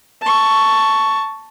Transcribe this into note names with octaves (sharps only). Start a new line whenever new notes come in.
A5 C#6